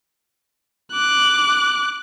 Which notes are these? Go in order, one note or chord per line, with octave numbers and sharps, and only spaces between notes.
D6 F#6